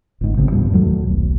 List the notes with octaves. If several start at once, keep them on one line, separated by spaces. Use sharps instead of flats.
G1 G#2
A1 C#3 C4
D#1 E2 G2 A#2
D#2 F#3 A3
D#1 B1